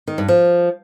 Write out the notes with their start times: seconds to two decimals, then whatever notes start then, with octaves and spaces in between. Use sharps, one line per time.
0.08 D#3
0.18 G2
0.28 F3